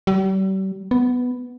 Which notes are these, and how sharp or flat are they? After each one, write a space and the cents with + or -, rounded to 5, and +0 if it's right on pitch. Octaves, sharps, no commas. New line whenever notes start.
G3 -40
B3 +5